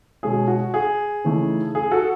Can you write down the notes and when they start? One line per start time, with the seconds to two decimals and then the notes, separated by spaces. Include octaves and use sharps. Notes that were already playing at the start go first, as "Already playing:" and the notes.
0.23 B2 G#3 C#4 G#4
0.48 F#4
0.74 G#4
1.24 C#3 E3 A3 D#4
1.75 G#4
1.91 F#4 A4